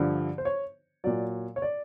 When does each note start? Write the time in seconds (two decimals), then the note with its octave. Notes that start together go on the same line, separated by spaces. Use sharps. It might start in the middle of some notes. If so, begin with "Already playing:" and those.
Already playing: G2 D3 F3
0.38 C5
0.45 C#5
1.04 A#2 F#3 D5
1.56 C#5
1.62 D5